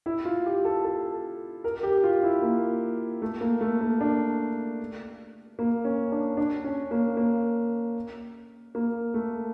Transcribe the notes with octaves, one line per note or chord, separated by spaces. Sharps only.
E4
F4
G4
A4
A4
A#4
G4
F4
E4
A#3
A3
A#3
A3
A#3
D4
A#3
C#4
D4
D4
C#4
A#3
A#3
A#3
A3